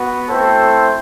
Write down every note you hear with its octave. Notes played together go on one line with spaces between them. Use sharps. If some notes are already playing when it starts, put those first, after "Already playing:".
Already playing: B3 F#4
A3 C4 E4 A4 C5